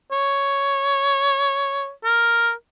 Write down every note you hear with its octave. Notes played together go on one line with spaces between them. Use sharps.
C#5
A#4